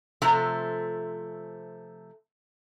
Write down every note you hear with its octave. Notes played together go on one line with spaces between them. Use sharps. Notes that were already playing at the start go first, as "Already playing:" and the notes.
C3 F3 A3 E5 A#5